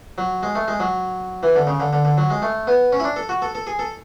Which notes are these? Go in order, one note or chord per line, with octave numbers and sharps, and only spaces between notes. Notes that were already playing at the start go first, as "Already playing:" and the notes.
F#3
G#3
A3
G#3
F#3
E3
D3
C#3
D3
D3
D3
F#3
G#3
A3
B3
C#4
E4
D4
A4
F#4
A4
A4
G#4
A4